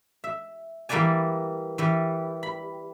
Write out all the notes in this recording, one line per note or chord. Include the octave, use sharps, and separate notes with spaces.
E5
E3 G3 A#3 B4 D5 G#5
E3 G3
B5